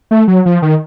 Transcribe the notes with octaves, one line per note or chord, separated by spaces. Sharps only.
A3
F#3
F3
D#3